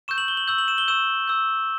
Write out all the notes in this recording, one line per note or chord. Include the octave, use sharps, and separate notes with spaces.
C#6 E6 G6 E7
F#7
G7
F#7
C#6 E6 G6 F#7
F#7
E7
G7
C#6 E6 G6 E7
C#6 E6 G6